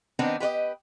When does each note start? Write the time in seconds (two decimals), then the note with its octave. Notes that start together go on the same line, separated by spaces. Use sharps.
0.19 D#3 B3 C4 D4 D#4
0.40 G4 B4 D5 D#5